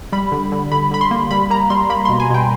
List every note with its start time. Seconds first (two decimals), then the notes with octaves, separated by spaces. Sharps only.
0.12 G3 B5
0.32 D3
0.52 D3
0.72 D3 B5
0.91 D3 B5
1.01 C6
1.11 A#3
1.31 G3 B5
1.50 A#3 A#5
1.70 G3 C6
1.90 A#3 B5
2.05 B2 C6
2.20 G#5
2.30 B2 G5